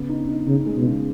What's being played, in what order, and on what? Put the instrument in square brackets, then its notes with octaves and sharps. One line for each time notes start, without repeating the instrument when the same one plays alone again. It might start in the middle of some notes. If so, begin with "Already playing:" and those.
Already playing: [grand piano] C#3 B3
D#4
D#4
[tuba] C#3 [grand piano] D#4
[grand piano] G#3
[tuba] B2
[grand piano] C#3